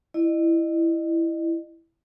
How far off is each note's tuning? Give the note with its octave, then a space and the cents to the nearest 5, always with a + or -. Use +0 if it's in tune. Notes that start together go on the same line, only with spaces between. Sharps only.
E4 +5 D#5 -35